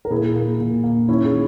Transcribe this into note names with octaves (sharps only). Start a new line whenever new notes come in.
A#4
A#2 E4 G#4
A#3
A#2
A#3
D#3 C#4 E4
E4 G#4